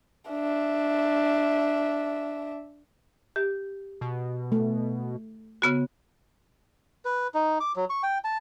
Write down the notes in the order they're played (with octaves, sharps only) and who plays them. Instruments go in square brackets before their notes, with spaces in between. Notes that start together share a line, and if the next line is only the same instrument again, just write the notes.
[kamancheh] D4 E5
[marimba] G4
[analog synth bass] B2
[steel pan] A3
[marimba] C#3 B3 F#4
[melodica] B4
D#4
D6
F#3
C#6
G5
A5